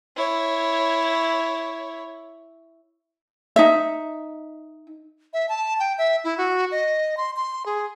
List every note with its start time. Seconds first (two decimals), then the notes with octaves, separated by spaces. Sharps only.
0.16 E4 C#5
3.56 D#4 E5
5.33 E5
5.49 A5
5.80 G5
5.98 E5
6.24 E4
6.38 F#4
6.71 D#5
7.17 C6
7.36 C6
7.66 G#4